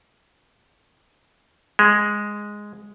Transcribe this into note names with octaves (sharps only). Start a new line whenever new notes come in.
G#3